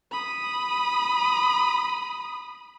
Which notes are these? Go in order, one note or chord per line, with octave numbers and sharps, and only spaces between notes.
B5 D#6